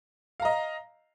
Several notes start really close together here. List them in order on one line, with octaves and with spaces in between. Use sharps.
F5 A#5 D#5